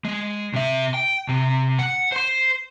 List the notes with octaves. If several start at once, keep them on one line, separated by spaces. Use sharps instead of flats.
G#3
C3 E5
G5
C3
F#5
C5 C6